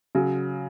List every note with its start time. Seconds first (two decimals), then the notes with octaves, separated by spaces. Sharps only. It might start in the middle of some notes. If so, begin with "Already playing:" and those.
0.15 C#3 F#3